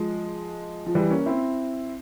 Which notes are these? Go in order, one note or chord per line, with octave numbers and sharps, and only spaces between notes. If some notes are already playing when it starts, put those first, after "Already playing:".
Already playing: F3 G#3
F3
E3 G3
A#3 C#4
C4 E4